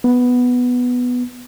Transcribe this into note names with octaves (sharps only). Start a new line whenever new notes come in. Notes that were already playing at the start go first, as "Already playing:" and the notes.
B3